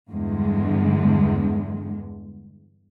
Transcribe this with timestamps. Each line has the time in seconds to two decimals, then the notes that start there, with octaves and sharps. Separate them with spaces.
0.10 E2 G2 D3 G#3